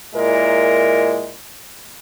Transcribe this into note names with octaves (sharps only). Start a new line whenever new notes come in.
A#2 G#3 E4 A#4